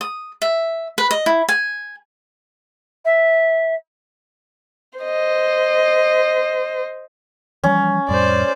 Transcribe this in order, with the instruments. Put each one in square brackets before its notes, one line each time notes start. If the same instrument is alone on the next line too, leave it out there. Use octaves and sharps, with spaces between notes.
[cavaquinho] D#6
E5
B4
D#5
E4
G#5
[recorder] E5
[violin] C5 D#5
[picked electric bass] E3 F3 G3 [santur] C#4
[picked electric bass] F2 A2 G3 [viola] C5 D5